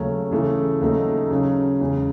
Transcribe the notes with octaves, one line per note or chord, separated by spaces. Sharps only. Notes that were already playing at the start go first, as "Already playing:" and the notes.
Already playing: D#2 C#3 F#3 A3 C#4
C#3 E3 A3
D#2 C#3 F#3 A3 D#4
C#3 F#3 C#4
E2 C#3 G#3